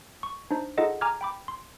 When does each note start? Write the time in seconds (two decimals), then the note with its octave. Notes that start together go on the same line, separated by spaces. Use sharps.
0.23 C#6
0.51 D4 D#4 C5
0.78 D#4 F4 G#4 A4 D#5 F#5
1.01 G#5 A#5 D6 F6 G#6
1.21 G5 B5 D6
1.48 C6